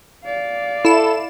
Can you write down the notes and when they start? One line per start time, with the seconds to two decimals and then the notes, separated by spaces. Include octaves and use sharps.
0.24 D5 F5
0.85 E4 A4 E7